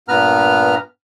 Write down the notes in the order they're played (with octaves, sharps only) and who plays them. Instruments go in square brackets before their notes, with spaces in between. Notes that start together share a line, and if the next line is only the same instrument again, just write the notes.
[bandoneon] G2 A#2 B3 B4 A#5 F6